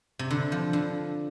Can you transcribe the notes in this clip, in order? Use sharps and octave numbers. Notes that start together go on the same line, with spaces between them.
C3
D3
F3
D3